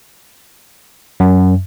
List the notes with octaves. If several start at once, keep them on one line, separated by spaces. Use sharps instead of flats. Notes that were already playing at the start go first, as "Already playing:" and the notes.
F#2